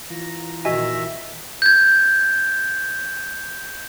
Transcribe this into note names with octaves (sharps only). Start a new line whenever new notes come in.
E3 F4 A#5
A#2 D#3 F#4 D#5 E5 G#5
G6 G#6